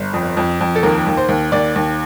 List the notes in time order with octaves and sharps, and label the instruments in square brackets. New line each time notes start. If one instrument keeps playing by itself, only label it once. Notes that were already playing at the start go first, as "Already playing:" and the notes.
Already playing: [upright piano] G1
F2
F2
F2
A4
D#2 A#4
D#2
C5
D#2
D#2 D5
D#2